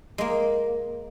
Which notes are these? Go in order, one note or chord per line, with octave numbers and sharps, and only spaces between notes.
G#3 A#3